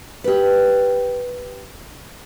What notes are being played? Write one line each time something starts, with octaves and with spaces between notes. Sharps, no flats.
G4 B4